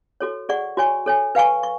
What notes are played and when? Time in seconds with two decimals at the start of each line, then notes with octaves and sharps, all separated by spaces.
0.20 F#4 A4 C#5
0.49 G#4 D5 F#5 C#6
0.77 F#4 C#5 G#5 C#6
1.06 A4 C#5 G#5
1.35 B4 F5 G#5 C#6
1.63 C#6